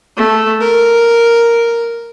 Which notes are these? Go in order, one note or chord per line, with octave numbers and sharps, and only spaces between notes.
A3
A#4